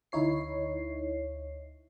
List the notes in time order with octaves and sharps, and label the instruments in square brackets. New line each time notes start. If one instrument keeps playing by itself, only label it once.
[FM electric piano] D2 D#4 E4 C#5 C7